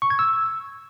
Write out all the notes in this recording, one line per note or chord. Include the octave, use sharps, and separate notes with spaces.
C#6
G#6
E6